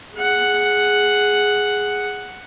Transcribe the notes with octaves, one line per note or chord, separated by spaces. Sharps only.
G#4 F#5